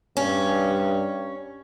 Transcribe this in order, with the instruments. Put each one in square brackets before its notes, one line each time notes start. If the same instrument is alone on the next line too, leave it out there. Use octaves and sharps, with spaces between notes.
[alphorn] G2 [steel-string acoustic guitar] C#4